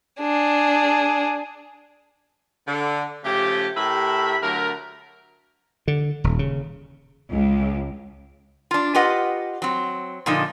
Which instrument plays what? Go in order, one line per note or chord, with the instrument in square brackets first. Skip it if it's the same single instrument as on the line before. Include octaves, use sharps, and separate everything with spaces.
[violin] D4 G#4
[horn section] D3
C#3 F3 A3 G4
A2 G4 A#4 E5 B5
D3 F#3 A3 A#4
[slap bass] D3
D#1
C#3
[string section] C#2
[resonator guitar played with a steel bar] D4 F4
F4 G4 B4 D#5 F#5
F#3 C4
A#2 D3 F3 D#4